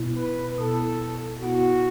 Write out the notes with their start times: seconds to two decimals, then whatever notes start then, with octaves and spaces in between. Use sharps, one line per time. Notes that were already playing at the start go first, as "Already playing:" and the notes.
Already playing: B2 B3 E4
0.17 B4
0.58 B2 B3 E4 A4
1.41 B2 B3 E4 F#4